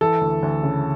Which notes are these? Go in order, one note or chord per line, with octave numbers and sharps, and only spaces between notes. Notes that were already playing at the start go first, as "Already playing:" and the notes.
E3 A4
D2
D2
C#3